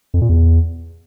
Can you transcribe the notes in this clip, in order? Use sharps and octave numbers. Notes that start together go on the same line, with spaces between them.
F2
A#2
E2